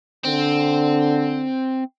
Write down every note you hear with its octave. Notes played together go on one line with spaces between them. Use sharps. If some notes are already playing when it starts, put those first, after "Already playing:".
D3 C4